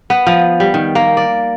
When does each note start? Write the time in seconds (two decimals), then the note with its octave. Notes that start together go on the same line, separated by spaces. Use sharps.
0.10 B3
0.27 F3
0.60 G3
0.74 D#3
0.95 A#3
1.17 D5